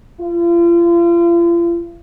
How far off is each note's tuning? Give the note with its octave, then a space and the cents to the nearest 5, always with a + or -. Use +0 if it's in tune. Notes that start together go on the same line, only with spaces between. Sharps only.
F4 -40